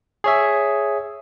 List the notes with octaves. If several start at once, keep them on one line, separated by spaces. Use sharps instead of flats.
G#4 C#5 E5